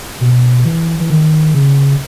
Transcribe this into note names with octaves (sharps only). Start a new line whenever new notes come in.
B2
E3
E3
D#3
C#3